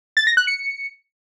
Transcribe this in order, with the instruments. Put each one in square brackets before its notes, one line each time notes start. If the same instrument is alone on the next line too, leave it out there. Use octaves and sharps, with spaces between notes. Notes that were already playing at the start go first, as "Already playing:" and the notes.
[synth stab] A6
A#6
F#6
C#7